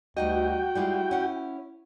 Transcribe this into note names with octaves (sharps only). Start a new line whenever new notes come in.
D2 G3 D#4 F#4 D#5 G5
G3 G#3 E4 F4
C#4 F#5